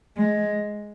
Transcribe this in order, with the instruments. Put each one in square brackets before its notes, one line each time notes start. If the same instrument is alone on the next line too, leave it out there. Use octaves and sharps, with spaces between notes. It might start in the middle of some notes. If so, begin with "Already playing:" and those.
[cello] G#3